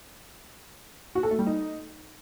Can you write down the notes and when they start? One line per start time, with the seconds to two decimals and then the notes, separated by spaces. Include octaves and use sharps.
1.15 F#4
1.23 A4
1.31 A3
1.39 G3
1.47 D#4